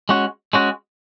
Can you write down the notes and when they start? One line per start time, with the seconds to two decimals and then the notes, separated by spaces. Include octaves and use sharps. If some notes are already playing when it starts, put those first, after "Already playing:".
0.09 G#3 C#4 F#4
0.53 G#3 C#4 F#4